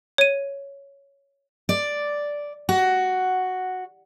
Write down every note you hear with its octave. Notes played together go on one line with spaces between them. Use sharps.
C#5 D#7
D5
F#4